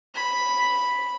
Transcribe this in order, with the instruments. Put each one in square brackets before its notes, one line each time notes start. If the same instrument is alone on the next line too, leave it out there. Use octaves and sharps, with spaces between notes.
[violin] B5